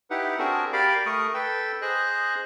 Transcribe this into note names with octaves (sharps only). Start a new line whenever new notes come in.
D#4 E4 G4 B4 F#5
C4 D4 F#4 G#4 A#4
G4 A#4 D5 F5 B5 D6
A3 A#4 C#6 D#6
A4 B4 G5 E6
G#4 C5 D#5 F#6